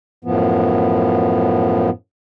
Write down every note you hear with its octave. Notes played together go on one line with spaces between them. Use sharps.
F#2 A2 F3 B3